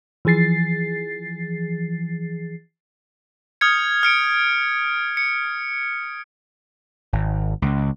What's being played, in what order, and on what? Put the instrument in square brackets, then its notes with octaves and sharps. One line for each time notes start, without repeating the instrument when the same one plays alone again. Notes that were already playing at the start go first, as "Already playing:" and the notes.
[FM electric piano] E3 F3 G#4 A6 C7
[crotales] D#6 F6 G6 G#6 C#7
F6 C#7 D7
C#7
[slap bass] G#1
C#2